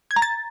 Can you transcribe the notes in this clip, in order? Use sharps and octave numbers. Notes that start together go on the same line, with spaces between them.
G#6
A#5
A6